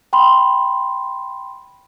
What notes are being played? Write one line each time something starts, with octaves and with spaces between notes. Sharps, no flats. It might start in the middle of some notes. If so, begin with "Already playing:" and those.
G5 B5 C6